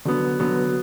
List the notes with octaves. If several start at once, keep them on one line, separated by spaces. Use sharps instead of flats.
D3 F#3 B3
D3 F#3 B3